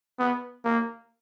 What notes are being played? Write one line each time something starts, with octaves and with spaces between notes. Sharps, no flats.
B3
A#3